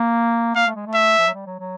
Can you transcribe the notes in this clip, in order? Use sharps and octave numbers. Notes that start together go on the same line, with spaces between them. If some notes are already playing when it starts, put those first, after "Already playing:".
Already playing: A#3
A#3 F5
A3
G#3
A3
E5
F3
F#3
G3
F#3
F#3